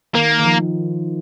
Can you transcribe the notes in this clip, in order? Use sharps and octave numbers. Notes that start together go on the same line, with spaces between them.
D#3 A#3
D#3
F3